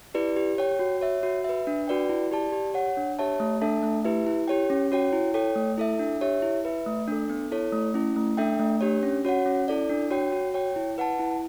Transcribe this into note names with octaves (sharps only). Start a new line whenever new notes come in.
E4 G4 B4 D5
G4
C#5 G5
F#4
C#5 E5
F#4
B4 E5
D4
F#4 B4 D5 G5
E4
G4 D5 A5
G4
C#5 F#5
D4
G4 C#5 E5 A5
A3
D4 A4 E5 A5
A3
E4 G4 B4 E5
E4
G4 C#5 G5
C#4
F#4 C#5 G5
E4
A4 C#5 G5
A3
E4 A4 E5
D4
G4 C#5 E5
E4
B4 E5
A3
D4 A4
B3
E4 A4 C#5
A3
C#4 E4
A3
D4 A4 E5 G5
A3
D4 G4 C#5
C#4
F#4 C#5 F#5
C#4
E4 A4 D5
D4
F#4 C#5 G5
F#4
C#5 G5
E4
B4 F#5 A5
E4